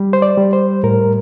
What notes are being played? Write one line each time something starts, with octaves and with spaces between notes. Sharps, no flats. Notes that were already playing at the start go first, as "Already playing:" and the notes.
Already playing: G3
C5
D5
G3
C5
A2 A#4